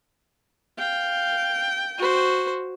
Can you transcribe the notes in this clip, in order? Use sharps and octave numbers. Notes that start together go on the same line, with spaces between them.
F5 G5
F#4 C5